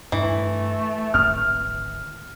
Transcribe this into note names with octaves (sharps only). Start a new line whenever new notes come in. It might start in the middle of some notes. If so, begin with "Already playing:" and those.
G2 E3 A3 D4
D1 G#1 C4 F6